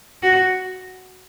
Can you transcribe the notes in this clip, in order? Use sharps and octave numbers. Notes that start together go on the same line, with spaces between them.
F#4